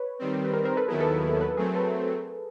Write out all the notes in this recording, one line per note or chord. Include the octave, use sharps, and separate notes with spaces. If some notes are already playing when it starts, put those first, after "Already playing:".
Already playing: B4 C#5
D#3 G3 C4
B4
A#4 C5
A#4 C5
A4 B4
D#2 D#3 F#3 B3 E4 G#4 A#4
A4 B4
A4 B4
A4 B4
A4
F#3 A3 C4 G#4 A#4
A4 B4